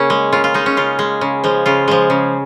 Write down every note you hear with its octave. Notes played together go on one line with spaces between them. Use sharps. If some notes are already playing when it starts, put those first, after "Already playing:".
Already playing: C#3 A#3 C#4
G#3
C#3 F4
F4
G#3 D#4
C#4
C#3 F4
G#3
C#3
F3 G#3
C#3 F4
F3 G#3
C#3